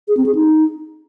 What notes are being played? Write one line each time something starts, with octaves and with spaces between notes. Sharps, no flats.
G#4
C4
G#4
D#4